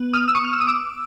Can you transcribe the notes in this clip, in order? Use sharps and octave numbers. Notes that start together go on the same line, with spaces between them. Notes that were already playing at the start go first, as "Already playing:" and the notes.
Already playing: B3
D#6 F6
E6
C#6 D#6
F6
E6
D#6
D6 E6